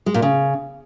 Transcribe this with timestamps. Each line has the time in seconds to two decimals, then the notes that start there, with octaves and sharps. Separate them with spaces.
0.06 G#3
0.14 A#2
0.22 C#3